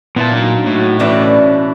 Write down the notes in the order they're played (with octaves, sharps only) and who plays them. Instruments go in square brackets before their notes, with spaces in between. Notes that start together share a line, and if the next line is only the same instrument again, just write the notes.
[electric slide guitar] A#2 [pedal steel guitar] B3 E4 A5
[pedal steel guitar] F#3 D4 D#4
[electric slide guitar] A2 [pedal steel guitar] D#4 F#4
[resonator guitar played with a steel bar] B2 E3 D4 [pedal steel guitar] C#4